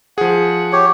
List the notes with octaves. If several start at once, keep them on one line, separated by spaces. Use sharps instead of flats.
F3 G#4 F#5
G4 C#5